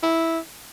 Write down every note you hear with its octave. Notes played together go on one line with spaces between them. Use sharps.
E4